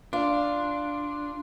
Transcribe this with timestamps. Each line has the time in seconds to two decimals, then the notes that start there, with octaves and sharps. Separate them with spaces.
0.13 D4 F4